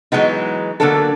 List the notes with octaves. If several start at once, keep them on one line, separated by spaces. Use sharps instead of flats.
E3 F#3 G#3 B3 D#4
D3 F#3 A#3 B3 D4 A4